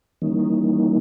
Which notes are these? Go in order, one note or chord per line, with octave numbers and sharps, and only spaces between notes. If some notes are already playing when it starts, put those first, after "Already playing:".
D#3 E3 G3 A#3 C#4 D#4